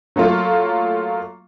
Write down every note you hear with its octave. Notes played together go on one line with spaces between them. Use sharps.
F#3 A3 A#3 F4